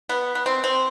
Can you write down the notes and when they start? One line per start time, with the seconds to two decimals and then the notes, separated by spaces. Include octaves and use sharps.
0.09 B3
0.35 B3
0.46 C4
0.64 C4